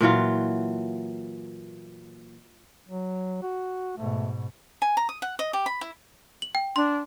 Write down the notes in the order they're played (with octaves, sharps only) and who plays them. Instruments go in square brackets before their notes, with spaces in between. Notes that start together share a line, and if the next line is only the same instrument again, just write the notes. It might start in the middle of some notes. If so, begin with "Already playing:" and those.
[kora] A#2 E3 F#3 F4
[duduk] F#3
F#4
[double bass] G#2 B2 [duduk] A3
[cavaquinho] G#5
A#5
D#6
F#5
D#5
G4
B5
E4
[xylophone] F#7
G5
[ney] D4 [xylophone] C6